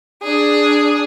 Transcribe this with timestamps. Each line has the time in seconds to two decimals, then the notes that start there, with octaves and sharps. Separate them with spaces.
0.23 D4 G#4